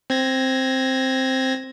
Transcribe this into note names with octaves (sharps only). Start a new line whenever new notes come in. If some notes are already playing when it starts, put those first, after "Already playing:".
C4 G#6 A#6